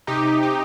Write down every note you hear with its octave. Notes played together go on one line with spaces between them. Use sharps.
C3 D#4 G4
G4